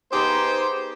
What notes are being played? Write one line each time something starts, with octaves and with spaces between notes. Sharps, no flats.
B3 D#4 G4 G#4 C5